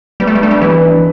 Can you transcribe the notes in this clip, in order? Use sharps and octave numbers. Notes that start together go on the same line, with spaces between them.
G3 B3
A3
G3
A3 D4
G3
E3 B4
D4